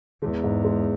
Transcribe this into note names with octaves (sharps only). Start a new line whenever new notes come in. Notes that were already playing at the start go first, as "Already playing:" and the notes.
E2 G#3
G#2
G#3